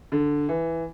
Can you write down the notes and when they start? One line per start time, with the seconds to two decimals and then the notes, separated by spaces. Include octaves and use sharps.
0.12 D3
0.49 E3